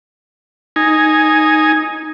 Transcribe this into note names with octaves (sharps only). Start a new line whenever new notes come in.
D#4 G#5